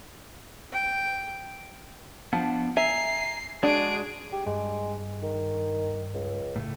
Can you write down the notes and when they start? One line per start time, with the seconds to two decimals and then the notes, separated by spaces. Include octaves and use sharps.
0.71 G5
2.33 F3 B3 D4
2.77 E5 G#5 A#5 C7
3.63 G#3 D4 F#4 G#4 D5 D7
4.33 G4
4.46 G2 G#3
5.23 D#3
6.14 C#2
6.56 A2 C#3 A3